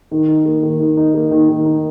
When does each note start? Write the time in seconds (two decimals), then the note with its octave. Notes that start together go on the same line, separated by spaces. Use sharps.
0.11 D#3
0.28 D#4
0.46 A#3
0.63 D#3
0.80 D#3
0.97 D#4
1.14 A#3
1.31 D#3
1.49 D#3
1.65 D#4